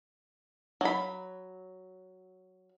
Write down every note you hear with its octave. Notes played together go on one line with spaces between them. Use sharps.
F#3 B5